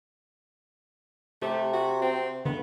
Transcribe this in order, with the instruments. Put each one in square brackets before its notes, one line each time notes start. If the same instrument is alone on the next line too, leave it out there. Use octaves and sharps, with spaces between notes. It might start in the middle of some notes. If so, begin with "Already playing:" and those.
[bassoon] C3 [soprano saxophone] A3 [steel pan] G4
[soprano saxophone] F#4
C4
[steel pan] D3 [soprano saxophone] B3